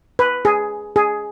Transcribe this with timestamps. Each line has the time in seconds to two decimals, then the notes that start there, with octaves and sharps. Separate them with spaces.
0.19 B4
0.45 G#4
0.96 G#4